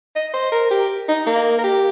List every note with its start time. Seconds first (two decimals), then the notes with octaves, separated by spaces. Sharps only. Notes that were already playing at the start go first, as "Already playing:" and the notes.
0.15 D#5
0.34 C5
0.52 A#4
0.71 G4
1.08 D#4
1.27 A#3
1.58 A#4
1.64 G4